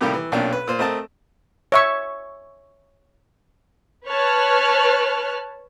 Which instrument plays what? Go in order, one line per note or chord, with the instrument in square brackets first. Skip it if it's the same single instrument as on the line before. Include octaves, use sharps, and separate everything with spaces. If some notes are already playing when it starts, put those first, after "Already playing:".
[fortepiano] A2 C3 D#3 G3 A#3 G4
E3
B1 A#2 C#4 D4 G5
B4
A#2 C5
A3 C4 A#4 D#5 A5
[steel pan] C#5 E5 C#6
[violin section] B4 C#5 A5 F6 F#6